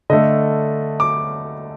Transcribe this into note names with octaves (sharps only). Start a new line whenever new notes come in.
D3 A3 D#5
D6